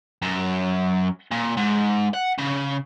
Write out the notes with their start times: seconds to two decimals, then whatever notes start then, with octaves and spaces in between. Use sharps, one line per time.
0.22 F#2
1.32 A#2
1.57 G#2
2.14 F#5
2.38 C#3